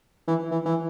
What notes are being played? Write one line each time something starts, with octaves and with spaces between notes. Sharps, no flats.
E3
E3
E3